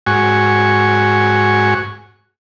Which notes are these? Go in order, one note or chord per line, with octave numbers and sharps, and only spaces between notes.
G#2 F#4 G#5 C#6